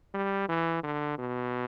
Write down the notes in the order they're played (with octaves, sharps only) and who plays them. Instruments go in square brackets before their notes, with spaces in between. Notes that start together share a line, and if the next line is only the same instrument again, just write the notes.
[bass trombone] G3
E3
D3
B2